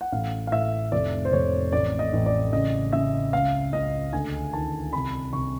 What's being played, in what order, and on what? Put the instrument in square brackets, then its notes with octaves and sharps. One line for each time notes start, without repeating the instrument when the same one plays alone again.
[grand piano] F#5
A1 F5
F5
A2 E5
F1 D5
C5
F1 C#5
A1 D5
D#5
A1
D5
C#3 D#5
C#3 E5
C#2 F5
C#2 D#5
D2 G#5
D#3 A5
C2 B5
C2 C#6